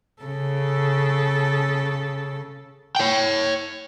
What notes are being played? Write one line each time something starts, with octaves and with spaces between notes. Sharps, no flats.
C#3 A4
C#5 G5